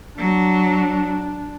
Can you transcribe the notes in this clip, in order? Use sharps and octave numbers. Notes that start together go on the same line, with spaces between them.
F#3 D4